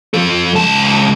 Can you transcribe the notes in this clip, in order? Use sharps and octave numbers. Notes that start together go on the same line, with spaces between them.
F3 A4
C#2 A5